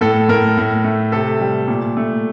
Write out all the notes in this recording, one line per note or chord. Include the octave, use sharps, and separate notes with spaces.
A2 A4
A2 A#4
A2
A3
C3 A4
G3
A#2
A3